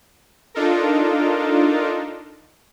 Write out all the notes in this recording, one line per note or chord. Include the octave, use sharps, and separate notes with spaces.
D4 D#4 F4 A4 A#4